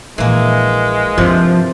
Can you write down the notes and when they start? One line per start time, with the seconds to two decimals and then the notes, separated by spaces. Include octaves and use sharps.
0.18 A#1 A#2 E3 G#3 A#3
1.18 G2 C3 F3